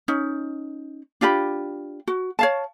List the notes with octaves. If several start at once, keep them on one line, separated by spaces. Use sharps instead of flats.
C#4 D#4
D4 F4 G4 B5
F#4
C#5 F5 A5